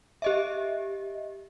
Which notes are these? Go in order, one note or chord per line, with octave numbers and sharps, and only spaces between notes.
G4 D#5 E5